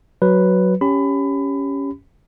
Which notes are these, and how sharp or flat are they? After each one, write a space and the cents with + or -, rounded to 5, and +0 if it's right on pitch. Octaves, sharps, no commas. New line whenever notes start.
F#3 +5 B4 +0
C#4 +5 G4 +0 B5 +25